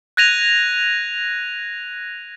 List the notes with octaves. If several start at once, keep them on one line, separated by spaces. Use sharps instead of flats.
F#6 G#6 A#6 D#7 F7